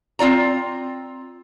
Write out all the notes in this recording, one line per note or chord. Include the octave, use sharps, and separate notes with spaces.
C4 F4 D5 A#5